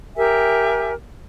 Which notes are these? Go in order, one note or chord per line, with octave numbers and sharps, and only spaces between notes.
G4 A#4 E5 G#5